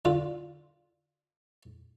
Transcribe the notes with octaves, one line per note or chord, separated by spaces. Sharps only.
D3 F4